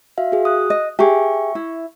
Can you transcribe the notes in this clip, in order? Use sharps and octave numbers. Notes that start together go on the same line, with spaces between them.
F#4 E5 F5
F#4 G#4
D#6 F#6
D#5
G4 G#4 E5 C#6
E4